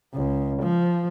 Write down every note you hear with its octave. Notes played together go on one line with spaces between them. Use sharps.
C#2
F3